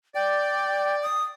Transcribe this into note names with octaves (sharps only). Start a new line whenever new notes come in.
D5 G5
D#6